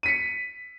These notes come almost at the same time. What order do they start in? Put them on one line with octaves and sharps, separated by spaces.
D#7 B6 C#7